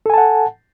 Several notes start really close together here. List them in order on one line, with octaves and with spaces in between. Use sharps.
A4 G#5 A5 F#5